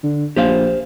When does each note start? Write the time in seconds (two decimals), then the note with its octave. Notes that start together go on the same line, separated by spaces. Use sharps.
0.03 D3
0.36 A#1 G4 C5 F5